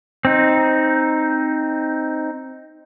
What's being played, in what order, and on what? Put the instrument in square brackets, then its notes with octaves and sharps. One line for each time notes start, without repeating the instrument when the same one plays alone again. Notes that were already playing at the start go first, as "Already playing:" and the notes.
[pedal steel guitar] C4 D#4